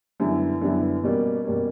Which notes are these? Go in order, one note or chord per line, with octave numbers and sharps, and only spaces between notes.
F#2 D3 G3 B3 E4
F#2 D3 G3 B3 E4
B2 G3 A#3 C#4
B2 G3 A#3 C#4